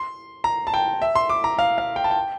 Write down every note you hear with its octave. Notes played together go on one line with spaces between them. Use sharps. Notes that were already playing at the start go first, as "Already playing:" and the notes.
Already playing: C6
A#5
A5
G5
E5
C6
D6
A#5
F5
F5
G5
A5
G5